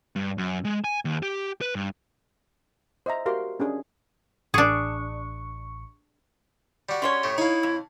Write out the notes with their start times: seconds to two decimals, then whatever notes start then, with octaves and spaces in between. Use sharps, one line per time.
0.16 G2
0.38 F#2
0.65 G#3
0.84 G#5
1.05 D#2
1.23 G4
1.61 B4
1.75 G2
3.06 C5 D#5 E5 A#5
3.26 F#4 G4 A#4 F5 C6
3.60 C#4 D4 G#4 G#5
4.54 A1 D4 G#4 C#6
6.89 G3 F#4
7.02 C#4 D4 C#5 C6
7.23 A2 A3 G4
7.38 D#4 E4 C#5 F5
7.63 F2